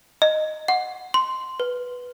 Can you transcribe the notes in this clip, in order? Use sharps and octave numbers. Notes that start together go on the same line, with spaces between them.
D#5
F#5
C6
B4